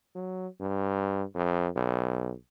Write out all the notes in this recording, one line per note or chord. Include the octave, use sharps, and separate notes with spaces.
F#3
G2
F2
B1